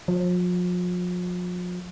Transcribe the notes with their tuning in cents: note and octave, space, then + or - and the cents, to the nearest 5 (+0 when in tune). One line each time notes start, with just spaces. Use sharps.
F3 +40